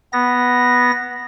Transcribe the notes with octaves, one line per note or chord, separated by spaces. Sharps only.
B3 A#6